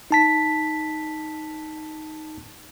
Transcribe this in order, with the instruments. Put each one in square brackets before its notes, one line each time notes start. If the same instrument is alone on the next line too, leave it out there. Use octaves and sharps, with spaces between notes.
[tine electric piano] D#4 A5 B6